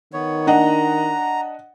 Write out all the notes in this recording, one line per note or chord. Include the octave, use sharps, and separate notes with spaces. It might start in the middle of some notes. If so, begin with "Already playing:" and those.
D#3 B3 C#5
D4 D#5 F#5 A#5